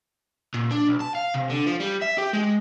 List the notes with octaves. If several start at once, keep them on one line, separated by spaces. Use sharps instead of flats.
A#2
D4
B1
A5
F5
C3
D3
F3
G3
E5
G4
G#3